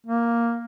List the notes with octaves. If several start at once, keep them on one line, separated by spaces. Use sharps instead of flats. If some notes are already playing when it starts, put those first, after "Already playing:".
A#3